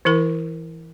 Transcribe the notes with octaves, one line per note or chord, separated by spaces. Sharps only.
E3 E4 A#4